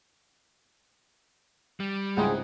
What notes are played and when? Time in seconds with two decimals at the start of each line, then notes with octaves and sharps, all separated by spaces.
1.80 G3
2.17 C#2 G#2 C4 E4 G#4 F#5